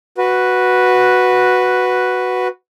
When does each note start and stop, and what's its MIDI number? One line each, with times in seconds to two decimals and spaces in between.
0.18 2.48 66
0.18 2.48 71